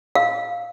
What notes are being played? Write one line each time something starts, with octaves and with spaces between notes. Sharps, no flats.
F5